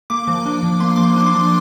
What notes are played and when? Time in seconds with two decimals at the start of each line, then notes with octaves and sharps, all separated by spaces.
0.10 A#3 D6
0.28 F3
0.46 D4
0.63 F3
0.80 A#3 C6
0.96 F3 D6
1.03 C6
1.16 D4 D6
1.27 C6
1.34 F3